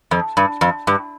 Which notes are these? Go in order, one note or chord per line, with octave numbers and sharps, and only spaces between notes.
F2
G2
F2
G2